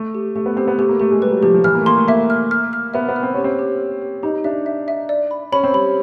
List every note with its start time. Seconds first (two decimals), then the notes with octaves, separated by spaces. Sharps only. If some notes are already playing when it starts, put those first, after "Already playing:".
Already playing: A3
0.14 G4
0.36 A3 G4
0.46 B3
0.57 C4 G4
0.68 B3
0.78 A3 G4
0.89 A#3
1.00 A3 G4
1.11 G#3
1.22 G3 B4
1.32 F#3
1.43 F3 G4
1.55 F3
1.64 E3 F6
1.75 A#3
1.81 A3
1.86 A#3 C6
1.97 A3
2.08 A#3 E5
2.30 F6
2.51 F6
2.73 F6
2.94 B3 E5
3.09 B3
3.16 F6
3.23 C4
3.34 C#4 G4
3.44 C4
3.59 G4
3.80 G4
4.02 G4
4.23 D#4 G4
4.44 D4 E5
4.66 E5
4.88 E5
5.09 D5
5.31 B5
5.52 C#4 B5
5.64 C4
5.74 G3 B5